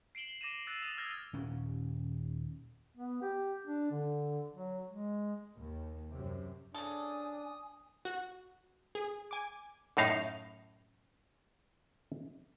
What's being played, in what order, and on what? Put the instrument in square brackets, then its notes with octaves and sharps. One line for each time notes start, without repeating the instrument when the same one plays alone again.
[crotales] C7 D7 E7 F#7 G7
D6 A#6 C7 D#7 E7
E6 F#6 A6 C7
D#6 C7 D#7 F7
D#6 F6 G#6 A#6 G7
[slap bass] D#1 C#4
[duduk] B3
G4
D4
D3
F#3
G#3
[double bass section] D#2
F#2 C3
[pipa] C#3 A4 [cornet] D4 [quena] G#5 [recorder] D#6
[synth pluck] F#4
G#4
G#5 D6
[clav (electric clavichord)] F#2 A2 D#4 F5